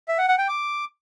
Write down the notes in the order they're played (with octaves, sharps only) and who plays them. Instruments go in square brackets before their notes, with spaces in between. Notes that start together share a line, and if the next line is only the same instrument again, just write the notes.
[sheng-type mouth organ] E5
F#5
F#5
G5
D6